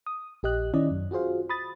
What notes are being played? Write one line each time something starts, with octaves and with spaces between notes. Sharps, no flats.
D#6
A#1 G4 D#5 F#6
D#3 C#4 E4 D5 D#5
F#2
F4 F#4 G#4 C5 F5
B5 D#6 A6